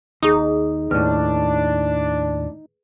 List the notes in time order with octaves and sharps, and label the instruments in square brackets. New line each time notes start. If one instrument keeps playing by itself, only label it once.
[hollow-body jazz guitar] D#2 [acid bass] D#4 [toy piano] G#4 D#6
[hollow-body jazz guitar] D#2 A2 [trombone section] D4 [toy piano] B4